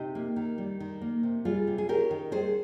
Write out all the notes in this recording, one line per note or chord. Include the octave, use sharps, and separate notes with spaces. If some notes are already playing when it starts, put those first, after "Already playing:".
Already playing: C3 D#4 G4
A#3
D#3
G3
D#3
A#3
C3
G3 F4 G#4
C3
G#4
C#4 G4 A#4
D#3
G3 G#4 C5